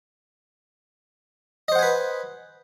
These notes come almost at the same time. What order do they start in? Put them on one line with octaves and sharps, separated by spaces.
D#5 C5 F#5 G#5 B4